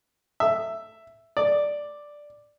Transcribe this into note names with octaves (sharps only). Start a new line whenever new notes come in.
E5
D5